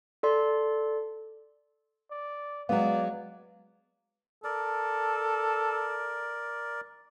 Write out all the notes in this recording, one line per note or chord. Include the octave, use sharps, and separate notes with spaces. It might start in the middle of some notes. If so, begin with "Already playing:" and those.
A4 D5 C6
D5
F#3 G#3 B3 D5 F5
A4 A#4 D5